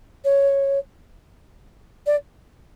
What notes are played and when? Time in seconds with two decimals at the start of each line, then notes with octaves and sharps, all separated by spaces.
0.24 C#5
2.06 D5